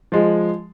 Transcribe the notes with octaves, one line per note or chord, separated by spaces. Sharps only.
F3 G#3